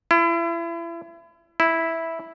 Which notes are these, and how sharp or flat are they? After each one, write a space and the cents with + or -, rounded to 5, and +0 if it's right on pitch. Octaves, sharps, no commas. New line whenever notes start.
E4 +35
E4 -5